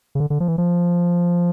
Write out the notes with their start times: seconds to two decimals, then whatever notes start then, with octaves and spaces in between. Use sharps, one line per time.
0.15 C#3
0.20 D3
0.30 D3
0.40 F3
0.48 E3
0.58 F3